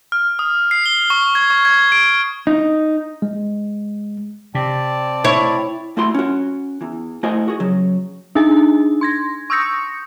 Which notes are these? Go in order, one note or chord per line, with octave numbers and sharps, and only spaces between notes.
F6
D#6
C7
G7
C#6
G#6
C#6
G#6
D7
D#4
G#3
C3 C4 D5 A5
E4 C#5
A3 E4 F#4 B5 C6
C#4 F#4
E2 E3
A3 E4 F#4 C5 D#5 G#5
F#4 G#4
C#3 F#3
D4 D#4 G#4 G#5
C6 G#6 A#6
C#6 D#6 E6 G6 A#6 C#7